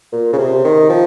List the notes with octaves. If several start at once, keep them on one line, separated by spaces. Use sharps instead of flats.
A#2
C#3
C3
D#3
F3